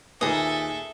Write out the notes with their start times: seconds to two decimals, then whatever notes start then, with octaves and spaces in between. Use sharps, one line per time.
0.21 D#2 A#2 G#4 A4 B4 D#5 E5